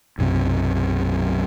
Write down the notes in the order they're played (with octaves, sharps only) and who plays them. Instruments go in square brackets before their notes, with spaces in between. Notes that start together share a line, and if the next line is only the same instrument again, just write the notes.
[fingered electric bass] B1 F#2 C3